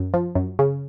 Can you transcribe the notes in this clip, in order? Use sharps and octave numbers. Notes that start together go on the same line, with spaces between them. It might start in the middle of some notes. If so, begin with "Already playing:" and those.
Already playing: F#2
F3
F#2
C#3